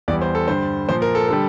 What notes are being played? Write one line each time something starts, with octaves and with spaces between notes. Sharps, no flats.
E2 E3 G3 D5
C5
A4
G2 D3 G3 C5
A#2 F3 C5
A#4
A4
D3 G3 A4